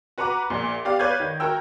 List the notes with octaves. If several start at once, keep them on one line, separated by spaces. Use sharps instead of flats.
F#4 B4 F#5 A#5 D6
A#1 A#2
B3 G4 D5 F5
B4 C#5 D5 F5 G6 G#6
D#3
F#4 A#4 G5 E6